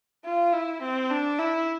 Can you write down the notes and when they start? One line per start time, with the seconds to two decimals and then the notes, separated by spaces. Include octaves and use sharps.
0.24 F4
0.52 E4
0.81 C4
1.10 D4
1.38 E4